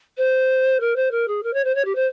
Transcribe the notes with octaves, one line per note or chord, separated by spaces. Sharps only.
C5
A#4
C5
A#4
G#4
A#4
C#5
C5
C#5
G4
C5